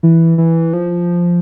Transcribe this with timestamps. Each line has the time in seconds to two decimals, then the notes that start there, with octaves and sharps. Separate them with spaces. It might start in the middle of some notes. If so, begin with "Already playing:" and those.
0.03 E3
0.38 E3
0.73 F3